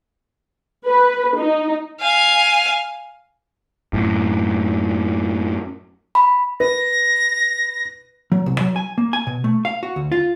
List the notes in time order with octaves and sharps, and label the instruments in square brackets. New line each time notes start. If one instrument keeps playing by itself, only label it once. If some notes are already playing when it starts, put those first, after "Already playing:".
[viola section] B4
D#4
[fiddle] F5 G#5
[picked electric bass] F#2 A2
[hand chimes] B5
[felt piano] B4 [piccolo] A#6
[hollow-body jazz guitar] F#3
C2
F#3
G#5
A#3
G#5
B2
A3
F5
F#4
D2
F4